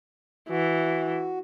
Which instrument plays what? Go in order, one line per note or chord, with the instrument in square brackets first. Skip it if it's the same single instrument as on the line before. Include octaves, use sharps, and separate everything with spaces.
[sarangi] E3 [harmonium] F#4